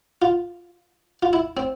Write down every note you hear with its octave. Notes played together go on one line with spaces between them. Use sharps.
F4
F4
E4
C4